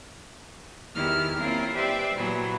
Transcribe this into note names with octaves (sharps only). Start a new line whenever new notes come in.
E2 D#3 E4 G4 F6
A#3 C4 C#4 E4 F4 A#4
G4 B4 C5 D5 E5 G5
A#2 E3 F#3 B3